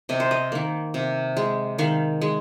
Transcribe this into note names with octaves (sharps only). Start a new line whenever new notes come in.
C3 D#5
C5
D#5
D#3 A#3
C3
G#3
D#3 F5
G#3